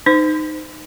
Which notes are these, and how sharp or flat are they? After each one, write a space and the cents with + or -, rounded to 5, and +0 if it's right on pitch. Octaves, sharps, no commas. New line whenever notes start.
D#4 -10 C5 -30